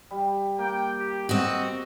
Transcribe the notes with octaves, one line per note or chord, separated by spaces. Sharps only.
G3
A#3 G5
G4
C4 F#4 D#5